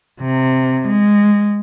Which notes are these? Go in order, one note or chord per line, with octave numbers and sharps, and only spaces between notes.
C3
G#3